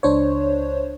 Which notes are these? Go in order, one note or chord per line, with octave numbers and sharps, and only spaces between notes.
C#2 D4 C5 C#5